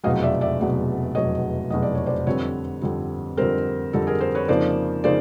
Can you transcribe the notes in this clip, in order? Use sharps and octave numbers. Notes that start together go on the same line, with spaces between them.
F1 E2 B2 F#3 D#5 F5
D5 E5
D5 E5
F1 E2 B2 F#3
F1 E2 B2 F#3 C#5 D#5
F1 E2 B2 F#3 D#5
D5
C#5
C5 D5
F2 D3 G3 C4 B4 C#5
F2 D3 G3 C4
F2 D3 G3 C4 A#4 C5
F2 D3 G3 C4 A4
G#4 A#4
A#4 C5
B4 C#5
F2 C#3 F3 A#3 D#4 C5 D5
C#3 F3 A#3 D#4 C5 D5